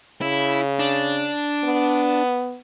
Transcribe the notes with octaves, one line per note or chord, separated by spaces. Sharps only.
C#3 E4
D4
B3